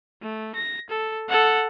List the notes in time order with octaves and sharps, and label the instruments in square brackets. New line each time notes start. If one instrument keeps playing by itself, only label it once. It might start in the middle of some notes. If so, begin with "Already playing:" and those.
[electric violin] A3
A#6
A4
A4 F#5